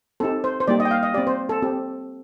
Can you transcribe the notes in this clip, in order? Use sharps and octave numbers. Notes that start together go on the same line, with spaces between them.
C4 D#4 G4 A4
C5
C5
G3 A#3 D#4 G4 D5
D#5
G5
F5
D#5
C4 G4 D5
C5
A4
C4 G4